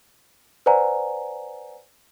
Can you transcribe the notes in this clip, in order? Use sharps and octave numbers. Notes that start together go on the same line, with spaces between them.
B4 C5 D5 F#5 G#5 A#5